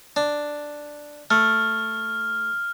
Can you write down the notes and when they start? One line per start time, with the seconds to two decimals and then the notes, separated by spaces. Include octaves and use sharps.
0.16 D4
1.31 A3 F6